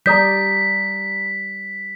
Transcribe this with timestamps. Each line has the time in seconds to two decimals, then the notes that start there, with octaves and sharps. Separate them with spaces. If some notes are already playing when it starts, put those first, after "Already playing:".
0.06 G3 D5 A#5 D#6 G6 B6